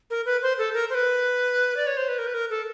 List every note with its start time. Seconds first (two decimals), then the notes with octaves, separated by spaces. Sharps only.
0.10 A#4
0.26 B4
0.42 C5
0.58 A4
0.74 A#4
0.90 C5
0.95 B4
1.77 D5
1.87 C#5
1.97 C5
2.09 B4
2.19 A#4
2.27 B4
2.34 A#4
2.50 A4